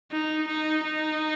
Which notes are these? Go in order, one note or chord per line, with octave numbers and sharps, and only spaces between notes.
D#4
D#4
D#4